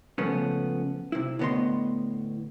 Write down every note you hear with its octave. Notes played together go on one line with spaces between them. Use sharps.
C#3 F3 G#3 A3 B3 C#4
C3 E4
A2 D3 B3 D#5 C6